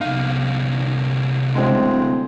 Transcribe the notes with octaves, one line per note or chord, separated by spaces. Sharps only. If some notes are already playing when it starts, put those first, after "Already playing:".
C2 D#4 F5
D1 G#3 C4